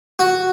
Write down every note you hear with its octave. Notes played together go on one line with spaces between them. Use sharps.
F#4